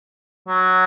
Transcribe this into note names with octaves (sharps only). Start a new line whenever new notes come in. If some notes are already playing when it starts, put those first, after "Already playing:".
F#3